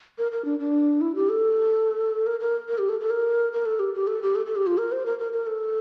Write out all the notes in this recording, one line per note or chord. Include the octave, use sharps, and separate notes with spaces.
A#4
A#4
D4
D4
E4
G4
A4
A#4
A#4
A#4
G4
A4
A4
A#4
A#4
A4
G4
G4
A4
G4
A4
A4
G4
F4
A#4
C5
A#4
A#4
A#4
A4